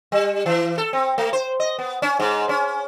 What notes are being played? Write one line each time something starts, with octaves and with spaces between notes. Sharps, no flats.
G3
E3
A4
C4
A3
C5
D#5
B3
C#4
G#2
C#4